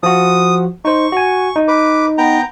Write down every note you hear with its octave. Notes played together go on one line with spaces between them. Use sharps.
F3 F#4 D#6
D#4 C5 C#6
F#4 G#5
D#4
B4 D6
B3 G5 A#5